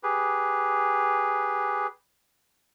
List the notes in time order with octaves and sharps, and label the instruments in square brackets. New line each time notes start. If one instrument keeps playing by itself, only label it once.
[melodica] G4 G#4 B4